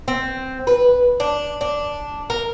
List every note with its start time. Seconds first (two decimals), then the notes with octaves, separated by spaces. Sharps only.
0.08 C4
0.67 B4
1.20 D4
1.61 D4
2.30 A#4